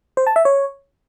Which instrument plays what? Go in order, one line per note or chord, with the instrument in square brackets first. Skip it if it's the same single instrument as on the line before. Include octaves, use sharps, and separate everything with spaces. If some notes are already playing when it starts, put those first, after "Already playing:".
[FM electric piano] C5
A5
E5
C#5